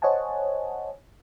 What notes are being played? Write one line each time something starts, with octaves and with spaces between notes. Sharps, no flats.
C5 C#5 D#5 F#5 G#5 A5